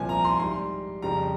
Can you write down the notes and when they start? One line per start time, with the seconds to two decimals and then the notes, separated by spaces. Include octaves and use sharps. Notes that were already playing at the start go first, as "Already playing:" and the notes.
Already playing: C2 A#2 F3 G#5
0.09 A#5
0.25 C6
0.40 G#2 G3 C6
1.02 F2 C#3 G3 A#5